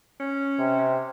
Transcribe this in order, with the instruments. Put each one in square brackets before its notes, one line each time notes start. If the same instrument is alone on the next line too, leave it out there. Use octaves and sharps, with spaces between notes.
[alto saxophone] C#4
[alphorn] C3